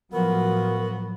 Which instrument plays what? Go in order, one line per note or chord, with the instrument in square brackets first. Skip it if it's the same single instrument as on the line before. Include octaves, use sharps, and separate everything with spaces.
[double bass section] A2 F3 F#3 [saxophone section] B3 F#4 [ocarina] A#4